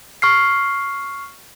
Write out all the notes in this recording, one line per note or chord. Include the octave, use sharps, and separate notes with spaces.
C#6 F6 C7